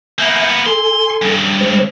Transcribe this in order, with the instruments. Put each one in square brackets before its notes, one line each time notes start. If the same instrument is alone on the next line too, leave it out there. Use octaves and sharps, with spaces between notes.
[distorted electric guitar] A#3 B3 [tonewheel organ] E5 G#5 G6
[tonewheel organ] A4 G#5 [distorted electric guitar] C6
[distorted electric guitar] G2 C#3
[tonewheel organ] G#3 C5